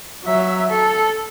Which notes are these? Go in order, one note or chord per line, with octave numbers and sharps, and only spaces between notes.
F#3 E5
A4